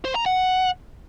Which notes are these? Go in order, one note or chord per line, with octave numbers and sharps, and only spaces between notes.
C5
A#5
F#5